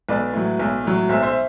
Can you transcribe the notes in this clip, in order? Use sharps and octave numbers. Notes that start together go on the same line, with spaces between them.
B1 B4 D5
A2 F#3
B1
A2 F#3
B1 C5 E5
C5 E5